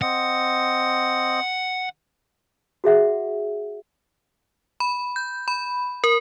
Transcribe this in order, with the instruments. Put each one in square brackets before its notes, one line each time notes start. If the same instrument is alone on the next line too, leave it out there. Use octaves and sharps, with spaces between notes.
[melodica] C4 D#5 [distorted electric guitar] F#5
[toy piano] F#4 G#4 E5 F#5
[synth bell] B5
G6
B5
A#4